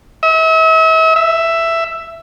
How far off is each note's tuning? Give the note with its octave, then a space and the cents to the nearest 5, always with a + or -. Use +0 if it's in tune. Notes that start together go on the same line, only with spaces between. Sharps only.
E5 -40
E5 +10